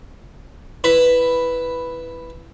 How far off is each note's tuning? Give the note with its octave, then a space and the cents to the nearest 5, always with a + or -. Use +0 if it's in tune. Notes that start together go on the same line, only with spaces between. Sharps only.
E4 +0 B4 +0